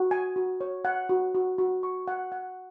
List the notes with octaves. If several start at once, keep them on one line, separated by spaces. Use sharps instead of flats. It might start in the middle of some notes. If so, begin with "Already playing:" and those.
Already playing: F#4
G#5
F#4
C#5
F#5
F#4
F#4
F#4
C#6
F#5
F#5